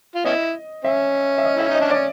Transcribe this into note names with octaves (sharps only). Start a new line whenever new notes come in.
F4
B3 C#4 E4 D#5
C#4 E5
E5
D#5
E4 E5
D#4
D#5
D4
C#4 D5